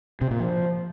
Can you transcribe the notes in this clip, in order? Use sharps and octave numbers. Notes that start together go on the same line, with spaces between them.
C3
A#2
F3